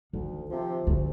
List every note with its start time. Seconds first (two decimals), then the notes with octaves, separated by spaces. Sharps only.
0.13 D2 D#3
0.50 C3 F3
0.87 D2 D3